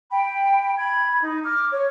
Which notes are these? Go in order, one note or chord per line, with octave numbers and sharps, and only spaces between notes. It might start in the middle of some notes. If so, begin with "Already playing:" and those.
G5 B5
B5 G#6
D#4
D6 F6
C#5